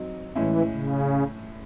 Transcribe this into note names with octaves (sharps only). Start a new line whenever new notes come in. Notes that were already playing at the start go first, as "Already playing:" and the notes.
Already playing: F#3 C4 D#4
A2 E3 G#3 C#4 E4
C#3